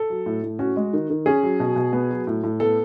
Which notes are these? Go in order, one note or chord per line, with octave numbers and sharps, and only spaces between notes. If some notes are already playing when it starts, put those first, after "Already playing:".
Already playing: A4
F#3
A2
A2
C#4 F#4
G#3
D#3
D#3
C#4 G#4
F#3
B2
B2
B3
F#3
A2
A2
B3 A4